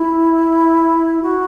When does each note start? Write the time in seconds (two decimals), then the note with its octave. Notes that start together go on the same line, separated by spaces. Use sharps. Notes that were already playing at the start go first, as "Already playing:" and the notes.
Already playing: E4
1.22 F#4